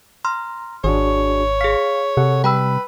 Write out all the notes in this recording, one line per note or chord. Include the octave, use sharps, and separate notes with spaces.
A#5 C6 F6
G#1 D4 F#4 G#4 C#5
G#4 F5 B6
C3 A4 F#5
G3 B4 G5 B5 E6